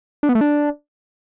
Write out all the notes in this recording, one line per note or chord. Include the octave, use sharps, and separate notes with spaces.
D4
B3
A3
D4